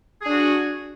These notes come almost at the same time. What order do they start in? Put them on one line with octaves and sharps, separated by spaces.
G#4 D4 F#4